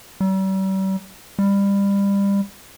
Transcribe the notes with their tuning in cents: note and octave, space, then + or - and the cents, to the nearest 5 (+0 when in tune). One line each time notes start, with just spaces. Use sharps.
G3 -40
G3 +25